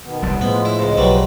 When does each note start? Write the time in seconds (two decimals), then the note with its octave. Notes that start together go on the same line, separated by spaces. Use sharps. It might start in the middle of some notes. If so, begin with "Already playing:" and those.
0.04 B2 D#3 B3
0.22 D#1 C2 G3 B3 A5
0.41 A2 F3 G#3 B3
0.65 E4
0.79 C#2 G#2 D#5
0.97 B1 F#3 G3 B4